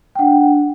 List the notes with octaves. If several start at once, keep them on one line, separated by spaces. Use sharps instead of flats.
G5
D4 F#5